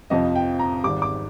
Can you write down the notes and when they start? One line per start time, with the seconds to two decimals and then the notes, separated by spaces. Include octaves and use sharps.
0.10 F2 C3 F3 D#5
0.36 G5
0.59 A#5
0.84 G#1 G#2 G3 D6
1.02 D6